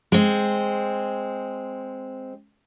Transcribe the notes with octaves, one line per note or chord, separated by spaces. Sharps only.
G#3 C4